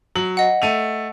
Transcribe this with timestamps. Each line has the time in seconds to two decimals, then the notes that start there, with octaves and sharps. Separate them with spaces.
0.16 F#3 F#7
0.37 D#5 F#5
0.62 A3 D#7 F7